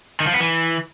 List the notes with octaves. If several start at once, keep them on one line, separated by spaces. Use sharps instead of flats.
D#3
F3
B3
E3